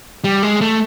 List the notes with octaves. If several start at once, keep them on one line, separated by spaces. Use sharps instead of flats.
G3
G#3
A3